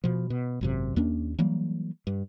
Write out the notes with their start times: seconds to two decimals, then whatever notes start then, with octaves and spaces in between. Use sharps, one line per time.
0.04 B2 F3
0.30 B2
0.61 G#1 F#2 C3
0.96 D#2 A#3 C#4 D4
1.39 E3 F#3 G3 A#3
2.07 G2